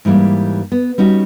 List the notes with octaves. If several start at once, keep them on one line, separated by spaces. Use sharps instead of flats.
G#2 E3 G3 A#3
B3
G3 C#4 D#4 F#4